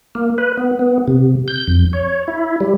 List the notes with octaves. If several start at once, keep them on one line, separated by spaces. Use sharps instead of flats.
A#3
B4
B3
B3
C3
G6
F2
C#5
E4
G3